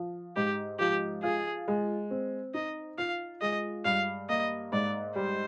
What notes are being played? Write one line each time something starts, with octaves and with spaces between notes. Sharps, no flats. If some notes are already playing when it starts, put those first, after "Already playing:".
Already playing: F3
G#2 G4
F3 G4
F4 G#4
G#3
C4
D#4 D#5
F4 F5
G#3 D#5
G2 F5
A#3 D#5
G#2 D5
G3 C5